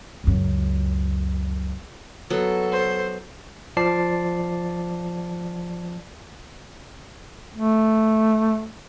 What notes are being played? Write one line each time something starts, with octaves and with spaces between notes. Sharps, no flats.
C#2 F#2
F#3 B3 A4
C5
F3 D5 A5 C7
A3